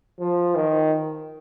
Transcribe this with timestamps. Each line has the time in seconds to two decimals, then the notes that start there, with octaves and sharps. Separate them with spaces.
0.20 F3
0.55 D#3